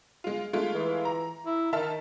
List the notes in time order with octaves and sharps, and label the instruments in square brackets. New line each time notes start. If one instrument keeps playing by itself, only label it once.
[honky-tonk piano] G#3 F4
G#3 A3 F4
[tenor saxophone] E3
[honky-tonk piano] A#5
[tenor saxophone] E4
[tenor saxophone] D#3 [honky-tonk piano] E5 A5 F6